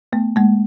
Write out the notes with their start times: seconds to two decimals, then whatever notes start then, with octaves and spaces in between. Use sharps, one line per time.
0.13 A3 B3
0.36 G#3 A#3